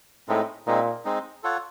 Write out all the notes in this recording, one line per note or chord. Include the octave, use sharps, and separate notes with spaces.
A2 G#3 C4 D#4
A#2 G#3 C4 D#4
G#3 C4 D#4
F4 A4 C#5 F#5